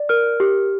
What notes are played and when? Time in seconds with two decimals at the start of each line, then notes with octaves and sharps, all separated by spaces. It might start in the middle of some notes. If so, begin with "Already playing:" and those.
Already playing: D5
0.09 A#4 F6
0.40 G4